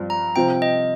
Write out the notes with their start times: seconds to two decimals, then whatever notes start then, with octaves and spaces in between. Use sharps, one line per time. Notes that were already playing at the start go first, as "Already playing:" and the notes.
Already playing: G2 F3 C4 F4
0.10 A#5
0.36 C3 F3 C4 F4 C5 G5
0.62 D#5